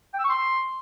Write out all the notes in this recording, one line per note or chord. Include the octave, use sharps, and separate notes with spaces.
G5
E6
C#6
C6